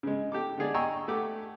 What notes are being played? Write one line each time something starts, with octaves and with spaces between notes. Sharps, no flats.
C#3 G#3
G4 A4 D6
D3 G#3 G#4 D5
D#5 G5 G#5 A#5 C#6 E6
A3 G4 F#5 D6